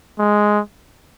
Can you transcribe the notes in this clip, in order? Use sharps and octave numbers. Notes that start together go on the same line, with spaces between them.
G#3